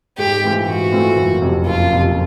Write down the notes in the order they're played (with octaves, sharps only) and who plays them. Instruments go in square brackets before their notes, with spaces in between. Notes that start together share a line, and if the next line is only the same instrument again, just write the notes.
[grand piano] G#2 [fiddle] G4
[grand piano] E3 A3 C4 F4
[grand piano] G#2 [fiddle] F#4
[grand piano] E3 A3 C4 F4
F#1
F2 C3
[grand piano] F#1 [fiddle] F4
[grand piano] F2 C3